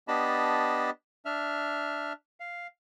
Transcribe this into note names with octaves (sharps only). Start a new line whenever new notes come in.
B3 D4 G4 D#5 A5 B5
D4 E5 F6
F5